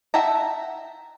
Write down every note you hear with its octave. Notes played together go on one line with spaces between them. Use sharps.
E5 F#5 G5 A5 A#5